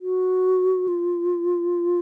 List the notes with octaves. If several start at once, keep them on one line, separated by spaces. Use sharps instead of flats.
F#4
F4